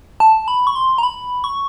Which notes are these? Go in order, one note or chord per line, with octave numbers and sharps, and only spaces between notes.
A5
B5
C#6
C6
A#5
B5
C#6